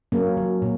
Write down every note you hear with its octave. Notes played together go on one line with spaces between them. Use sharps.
F#3 A#3 C#4
F#3
A#2